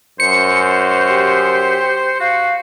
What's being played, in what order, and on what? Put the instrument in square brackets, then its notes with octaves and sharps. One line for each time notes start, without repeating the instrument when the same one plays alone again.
[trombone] F#2 [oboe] C5 [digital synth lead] C#7
[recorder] G4
[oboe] F#4 [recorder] F5